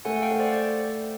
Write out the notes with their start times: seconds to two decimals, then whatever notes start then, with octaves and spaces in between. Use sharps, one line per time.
0.05 A3 F#5 G#5
0.16 F#5
0.22 F5 G5
0.31 A3
0.40 C5 D5
0.52 D5